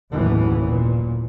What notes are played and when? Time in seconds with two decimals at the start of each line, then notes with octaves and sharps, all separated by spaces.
0.12 F#1 D#2 A2 E3 B3
0.67 A#2